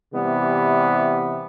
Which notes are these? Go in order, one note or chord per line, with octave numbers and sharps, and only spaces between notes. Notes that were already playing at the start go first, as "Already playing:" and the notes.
C3 E3 G3 B3